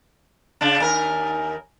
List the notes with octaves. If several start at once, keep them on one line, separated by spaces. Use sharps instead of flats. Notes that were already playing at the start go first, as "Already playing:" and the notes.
C#3 D4 F5
D#2 A#4 G#5